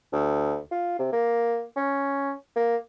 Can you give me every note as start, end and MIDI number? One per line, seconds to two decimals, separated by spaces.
0.12 0.59 38
0.71 0.95 65
0.99 1.08 48
1.13 1.64 58
1.76 2.31 61
2.56 2.76 58